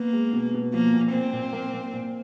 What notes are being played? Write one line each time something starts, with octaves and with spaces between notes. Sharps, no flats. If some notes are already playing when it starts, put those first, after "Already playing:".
Already playing: A#3 B3
G#3
B2
B2
F3 A#3
A#2
A#2 C4
A#2
A#3
A#2
A#2